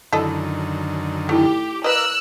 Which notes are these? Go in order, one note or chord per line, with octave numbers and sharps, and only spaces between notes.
F#2 D3 D#3 E4 A4 D#5
A3 D#4 E4 G4 A4
A#4 B4 D5 D#5 F5 E6 F#6